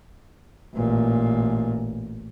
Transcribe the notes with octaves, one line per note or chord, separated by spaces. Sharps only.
A1 A#2